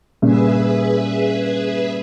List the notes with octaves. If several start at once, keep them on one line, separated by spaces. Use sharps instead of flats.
G2 A#2 C#3 G#4 B4 E5